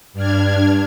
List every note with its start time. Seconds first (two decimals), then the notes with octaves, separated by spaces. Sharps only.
0.13 G2 D4 F6 G#6